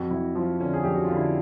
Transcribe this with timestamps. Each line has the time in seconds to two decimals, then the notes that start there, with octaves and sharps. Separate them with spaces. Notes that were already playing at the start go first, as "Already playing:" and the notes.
Already playing: F2 F#4
0.10 F2 E4
0.35 F3 F4
0.60 D3 C#4
0.74 G#4
0.83 F2 G4
0.94 F#4
1.04 F4
1.09 D3
1.16 E4